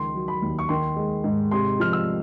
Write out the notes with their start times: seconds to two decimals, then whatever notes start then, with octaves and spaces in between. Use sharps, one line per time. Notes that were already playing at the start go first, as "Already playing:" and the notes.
Already playing: C#2 D#3 F3 C6
0.15 F#3
0.28 B5
0.42 D#2
0.59 C#6
0.69 D#3 C6
0.96 G#3
1.24 G#2
1.51 C3 C6
1.80 F3 F6
1.93 E6